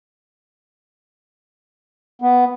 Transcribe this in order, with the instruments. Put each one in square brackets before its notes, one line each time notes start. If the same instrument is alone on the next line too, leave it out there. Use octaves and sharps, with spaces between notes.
[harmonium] B3